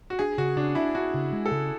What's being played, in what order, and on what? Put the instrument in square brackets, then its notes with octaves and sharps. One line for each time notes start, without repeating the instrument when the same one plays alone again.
[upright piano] F#4
[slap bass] D4 [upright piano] G#4
[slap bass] C#3 [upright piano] F#4
[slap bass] C#3 [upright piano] D4
[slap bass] D4 [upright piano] E4
[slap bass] D4 [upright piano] F#4
[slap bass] C#3
G#3
[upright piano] A4
[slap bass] C#3